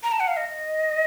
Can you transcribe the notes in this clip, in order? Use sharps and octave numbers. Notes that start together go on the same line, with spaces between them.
A#5
A5
F#5
F5
D#5